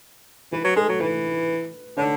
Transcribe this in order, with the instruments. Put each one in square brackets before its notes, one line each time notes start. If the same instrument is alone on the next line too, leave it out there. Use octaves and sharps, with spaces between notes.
[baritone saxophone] E3 [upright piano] B4
[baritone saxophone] F#3
[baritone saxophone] G#3 [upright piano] A4
[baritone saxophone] F#3
[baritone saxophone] E3 [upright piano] B4
[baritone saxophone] D3 [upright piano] C#5